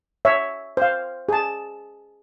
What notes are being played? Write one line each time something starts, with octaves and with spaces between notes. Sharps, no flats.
C#5 E5
C5 F5
G#4 A5